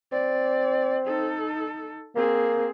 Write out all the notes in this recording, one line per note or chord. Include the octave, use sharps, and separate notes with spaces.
C4 D5
D#4 A4
A#3 C4 G#4